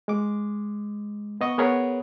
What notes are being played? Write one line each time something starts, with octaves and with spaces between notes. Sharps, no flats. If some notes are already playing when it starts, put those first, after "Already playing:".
G#3 D6
B3 D#5 C#6 D#6
B3 G#4 A#4 B4 C#5